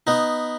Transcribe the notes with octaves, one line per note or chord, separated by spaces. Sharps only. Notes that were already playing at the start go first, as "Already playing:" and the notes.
B3 D#4